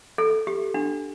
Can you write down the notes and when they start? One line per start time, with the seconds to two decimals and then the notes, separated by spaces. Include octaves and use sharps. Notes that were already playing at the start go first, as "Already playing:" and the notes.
0.18 A4
0.47 G4
0.74 D4